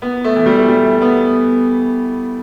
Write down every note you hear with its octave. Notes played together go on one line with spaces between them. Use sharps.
B3
A3
E3
G3
A3
G3
A3
B3